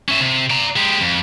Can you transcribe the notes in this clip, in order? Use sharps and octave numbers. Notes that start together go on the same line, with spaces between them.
C#4 E5
C3
D5 A#5
G#3 G4
F2